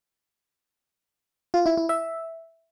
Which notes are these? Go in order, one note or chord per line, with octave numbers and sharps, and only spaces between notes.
F4
E4
E4
E5